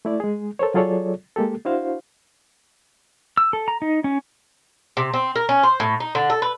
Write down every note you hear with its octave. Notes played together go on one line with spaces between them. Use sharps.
A3 E4 D5
G#3 G#4
A4 A#4 C5 C#5
F#3 F4 G#4 A4 C#5 D5
G#3 A#3 G4 A4
D4 E4 F#4 C5 F5
E6
A4
A#5
D#4
C#4
C3
C4
A#4
C#4
C5
A2
D#4
D3
A4
B4